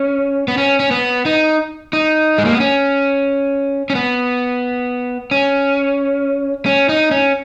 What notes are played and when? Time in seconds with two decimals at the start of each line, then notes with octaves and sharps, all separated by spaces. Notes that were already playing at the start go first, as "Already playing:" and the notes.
Already playing: C#4
0.48 B3
0.57 C#4
0.80 C#4
0.91 B3
1.26 D#4
1.93 D#4
2.38 G#3
2.45 A#3
2.53 B3
2.60 C#4
3.90 C#4
3.95 B3
5.31 C#4
6.66 C#4
6.89 D#4
7.11 C#4